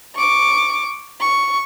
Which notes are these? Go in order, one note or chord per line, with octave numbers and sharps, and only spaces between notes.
C#6 D6
C#6